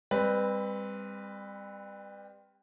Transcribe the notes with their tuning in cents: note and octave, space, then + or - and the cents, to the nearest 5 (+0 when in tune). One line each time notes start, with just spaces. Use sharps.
G3 +35 C4 +0 B4 +0